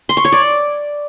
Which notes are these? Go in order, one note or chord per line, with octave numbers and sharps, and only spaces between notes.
C6
C#6
C#5
D5